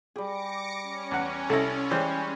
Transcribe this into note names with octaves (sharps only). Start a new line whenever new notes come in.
G3 G4 G#4 D6 A#6 C#7
C#4
E2 F#5
C2 E4 A4 C#5 D#5
E3 G3 G#3 G#4 C5